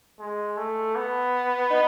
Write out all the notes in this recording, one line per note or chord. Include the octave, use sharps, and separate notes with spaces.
G#3
A3
B3
D#4